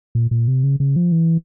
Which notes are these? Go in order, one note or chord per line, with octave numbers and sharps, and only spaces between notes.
A#2
A#2
C3
C#3
C#3
F3
E3